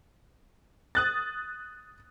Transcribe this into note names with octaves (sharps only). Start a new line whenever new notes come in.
D#6 F#6 A6